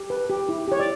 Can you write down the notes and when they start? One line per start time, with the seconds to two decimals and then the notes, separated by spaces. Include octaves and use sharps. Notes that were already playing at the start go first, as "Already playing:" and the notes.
Already playing: G4
0.10 B4
0.30 G4
0.49 E4
0.68 G4 C#5
0.80 D5